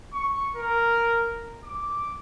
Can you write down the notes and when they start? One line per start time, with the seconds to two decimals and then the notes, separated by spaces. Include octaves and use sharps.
0.14 C#6
0.56 A#4
1.64 D6